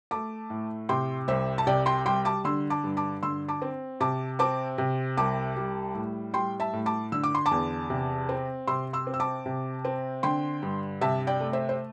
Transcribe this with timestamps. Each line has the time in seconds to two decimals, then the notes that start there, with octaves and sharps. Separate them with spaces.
0.11 A3 A5 D6
0.50 A2
0.89 C3 G5 C6
1.28 C2 C5 E5
1.58 A5
1.67 C3 D5 G5
1.86 G5 C6
2.06 G3 G5 C6
2.25 A5 D6
2.44 D3 C6 E6
2.70 A5 D6
2.84 G2
2.97 A5 D6
3.23 D3 C6 E6
3.48 A5 D6
3.62 C4
4.00 C3 A5 D6
4.39 C4 A5 D6
4.78 C3
5.17 C2 A5 D6
5.56 G3
5.95 A2
6.34 G3 G5 C6
6.60 E5 A5
6.73 A2
6.86 A5 D6
7.12 D3 E6
7.23 D6
7.35 C6
7.46 A5 D6
7.51 E2
7.90 C3
8.29 C4
8.68 C3 C6 E6
8.93 C6 E6
9.07 C4
9.14 E6
9.20 A5 D6
9.46 C3
9.85 C4
10.23 D3 G5 C6
10.63 G2
11.01 C3 E5 A5
11.27 D5 G5
11.40 A3
11.53 C5 E5
11.69 C5